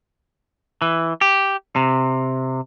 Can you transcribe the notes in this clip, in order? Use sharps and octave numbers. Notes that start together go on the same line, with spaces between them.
E3
G4
C3